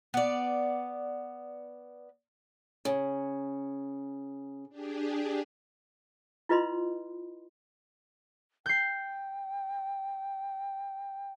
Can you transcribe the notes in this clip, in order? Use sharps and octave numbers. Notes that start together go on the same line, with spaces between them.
B3 D5
C#3
D4 G4 G#4
E4 F4 B4 D#5 B5 C6
G5 G6 C7